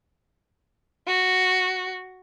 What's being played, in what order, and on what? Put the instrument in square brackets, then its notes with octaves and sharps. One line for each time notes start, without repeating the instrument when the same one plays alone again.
[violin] F#4